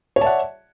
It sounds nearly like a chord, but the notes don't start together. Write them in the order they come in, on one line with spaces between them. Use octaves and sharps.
C#5 D5 A5 E5 F#5